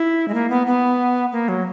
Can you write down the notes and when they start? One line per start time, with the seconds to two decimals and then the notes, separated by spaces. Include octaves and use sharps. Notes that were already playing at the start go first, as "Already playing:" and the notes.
Already playing: E4
0.28 G#3
0.34 A#3
0.50 B3
0.67 B3
1.32 A#3
1.49 F#3